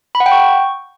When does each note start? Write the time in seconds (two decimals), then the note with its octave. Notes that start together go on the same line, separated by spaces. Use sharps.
0.15 B5
0.20 F#5
0.26 G5
0.32 C#6